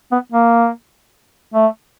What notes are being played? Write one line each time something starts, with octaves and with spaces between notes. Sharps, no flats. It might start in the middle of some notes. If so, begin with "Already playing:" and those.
B3
A#3
A3